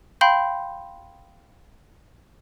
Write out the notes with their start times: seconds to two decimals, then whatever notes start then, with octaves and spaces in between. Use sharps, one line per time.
0.21 F5 G5 B5 C6 G6